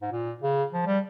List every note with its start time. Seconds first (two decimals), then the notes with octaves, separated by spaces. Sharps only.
0.02 G#2
0.11 A#2
0.42 C#3
0.73 F3
0.86 G3